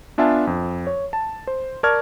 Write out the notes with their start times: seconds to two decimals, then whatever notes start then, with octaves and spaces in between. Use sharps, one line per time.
0.18 B3 D4 F4 E5 G#5 A5
0.47 F2
0.87 C#5
1.13 A5
1.47 C5
1.83 A#4 D5 A5 C#6 F6 G#6